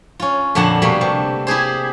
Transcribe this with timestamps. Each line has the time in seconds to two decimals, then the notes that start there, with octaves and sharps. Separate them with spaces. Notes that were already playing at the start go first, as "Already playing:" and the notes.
0.20 C#4 F4
0.55 F2 A#2 D3 D4 F#5 A5
0.82 B2 G3 A3 A#3
1.01 C3
1.47 E4 G4 G#4 C5